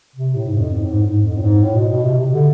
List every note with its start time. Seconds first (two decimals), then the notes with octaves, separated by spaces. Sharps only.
0.16 C3
0.35 A2
0.45 G#2
0.55 G#2
0.59 F2
0.74 G#2
0.81 A2
0.88 G#2
1.03 G#2
1.23 F2
1.37 A2
1.42 G#2
1.61 A2
1.76 B2
1.89 B2
2.04 C3
2.18 C3
2.33 D3